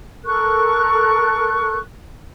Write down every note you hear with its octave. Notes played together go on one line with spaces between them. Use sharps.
A4 A#4 C#6 F#6